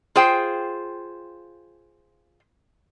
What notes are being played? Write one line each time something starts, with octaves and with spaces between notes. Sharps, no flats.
F4 G#4 C5 G5